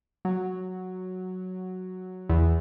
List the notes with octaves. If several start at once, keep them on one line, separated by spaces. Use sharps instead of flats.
F#3
E2